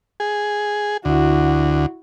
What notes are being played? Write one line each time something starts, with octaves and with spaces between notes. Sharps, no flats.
G#4
D2 E4 F#4